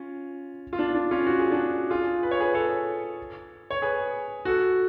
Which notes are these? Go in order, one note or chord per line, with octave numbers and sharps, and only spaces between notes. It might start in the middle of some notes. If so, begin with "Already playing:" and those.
Already playing: C#4 F4
F4
D4
D4
C#4 F4
F#4
G#4
D4 F#4
F4 G#4
B4
C#5
G#4 B4
A4 C#5
C#5
G#4 B4
F#4 A4